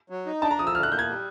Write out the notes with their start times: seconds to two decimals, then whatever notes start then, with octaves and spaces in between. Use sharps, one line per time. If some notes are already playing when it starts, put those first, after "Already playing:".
0.10 F#3
0.26 D#4
0.42 D4 A5
0.51 A#5
0.59 F3 D#6
0.67 E6
0.75 D3 F6
0.83 F#6
0.91 A#3 G6
0.99 G#6
1.07 G3